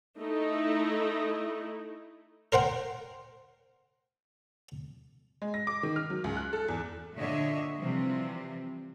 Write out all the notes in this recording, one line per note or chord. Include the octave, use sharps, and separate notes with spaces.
A3 D#4 E4
A#4 C5 F#5 G5
G#3
A#6
D6
D#3
F6
F#3
C#2
F#6
A4
E2
A#2 D3 D4 C#5 D#5 E5
C3 E3 F3 G3 C4